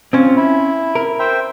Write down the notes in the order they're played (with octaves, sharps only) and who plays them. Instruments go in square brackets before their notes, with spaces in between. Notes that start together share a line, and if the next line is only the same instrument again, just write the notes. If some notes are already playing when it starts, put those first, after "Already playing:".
[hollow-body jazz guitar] C4 C#4 [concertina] F4
[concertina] E4
[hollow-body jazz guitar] A#4
[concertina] C5 E5 G5